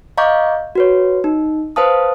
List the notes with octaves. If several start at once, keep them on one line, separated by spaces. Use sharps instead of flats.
D#5 F5 A#5 C#6 D6 G6
F#4 B4 C#5
D#4
B4 C5 F5 A5 D#6